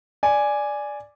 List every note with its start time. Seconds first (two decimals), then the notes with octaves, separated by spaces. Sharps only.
0.23 D5 G#5